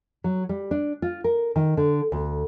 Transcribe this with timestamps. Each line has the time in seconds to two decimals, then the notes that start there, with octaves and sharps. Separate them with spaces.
0.24 F#3
0.49 G3
0.71 D4
1.02 F4
1.24 A#4
1.56 D#3
1.77 D3
2.12 D2